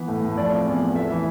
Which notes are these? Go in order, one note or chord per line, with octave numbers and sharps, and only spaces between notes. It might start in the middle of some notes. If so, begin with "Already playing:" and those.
Already playing: E3 B3 B4
A2
A2
F3 D5
C3
E2
B3
A3 E5
E3